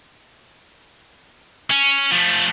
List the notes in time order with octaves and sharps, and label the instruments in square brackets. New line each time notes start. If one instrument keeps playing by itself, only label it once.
[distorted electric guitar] C#4
F3 A3